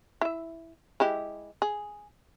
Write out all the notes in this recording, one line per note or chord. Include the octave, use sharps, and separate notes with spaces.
E4 E5
G#3 E4 G4
G#4